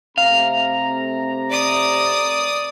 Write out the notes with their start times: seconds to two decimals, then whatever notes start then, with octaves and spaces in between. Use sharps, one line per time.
0.18 C3 A3 F5 A#5
1.50 D5 D#6